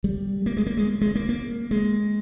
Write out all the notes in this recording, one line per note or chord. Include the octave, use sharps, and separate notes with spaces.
G3
A#3
G#3
A#3
G#3
G#3
A#3
A#3
G#3